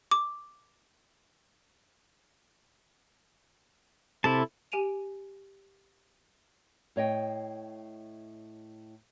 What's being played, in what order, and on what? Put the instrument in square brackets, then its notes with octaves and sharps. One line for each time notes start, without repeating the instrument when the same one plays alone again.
[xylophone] D6
[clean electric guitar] C3 [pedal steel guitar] E4 A4 A5
[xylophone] G4 G#5 D7 D#7 F7
[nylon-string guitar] A2 C#5 D#5 G5